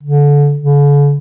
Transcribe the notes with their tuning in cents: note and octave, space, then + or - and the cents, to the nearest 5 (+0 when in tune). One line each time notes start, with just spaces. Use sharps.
D3 -25
D3 -45